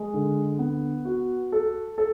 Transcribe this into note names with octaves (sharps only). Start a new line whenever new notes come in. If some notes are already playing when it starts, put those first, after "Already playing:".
Already playing: G#3
D3
B3
F#4
A4
A4